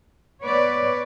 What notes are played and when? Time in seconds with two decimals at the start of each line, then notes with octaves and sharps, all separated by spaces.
0.42 B3 B4 C#5 D5